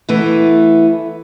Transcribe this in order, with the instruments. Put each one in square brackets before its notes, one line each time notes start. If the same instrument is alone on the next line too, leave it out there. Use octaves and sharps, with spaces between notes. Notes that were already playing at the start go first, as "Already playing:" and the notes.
[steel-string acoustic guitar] E3 A3 B3